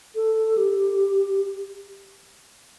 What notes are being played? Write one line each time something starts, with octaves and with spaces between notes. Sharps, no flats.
A4
G4